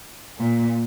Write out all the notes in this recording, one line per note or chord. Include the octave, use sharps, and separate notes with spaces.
A#2